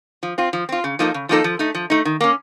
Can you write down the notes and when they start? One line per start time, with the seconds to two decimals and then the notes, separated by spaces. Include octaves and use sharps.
0.23 F3
0.38 C4 F4
0.53 F3
0.69 C4 F4
0.84 C#3
0.99 F3 A#3 D#4 A4
1.14 C#3
1.29 F3 A#3 D#4 A4
1.44 F3
1.59 A3 D#4
1.75 F3
1.90 A3 D#4
2.05 D#3
2.21 A#3 C#4